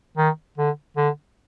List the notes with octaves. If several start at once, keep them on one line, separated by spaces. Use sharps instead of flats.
D#3
D3
D3